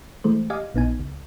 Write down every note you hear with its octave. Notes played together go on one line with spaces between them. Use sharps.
E3 G#3 A3 C5
G4 D5 D#5 F5 G#5
A#1 B3 D#4 G#5
C#2